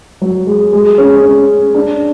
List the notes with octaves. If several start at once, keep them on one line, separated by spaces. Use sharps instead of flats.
F#3
G#3
G#3
C#4
C#4
D4